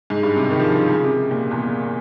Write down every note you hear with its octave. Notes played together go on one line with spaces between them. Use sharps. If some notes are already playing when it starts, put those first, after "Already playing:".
G#2
G2
C3
D#3
F3
F3
C#3
C#3
C3
A#2
E2